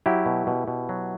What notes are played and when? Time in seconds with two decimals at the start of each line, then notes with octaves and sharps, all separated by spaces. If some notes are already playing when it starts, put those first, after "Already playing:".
0.06 F#3 E4 G4
0.26 B2
0.47 B2
0.68 B2
0.89 F#3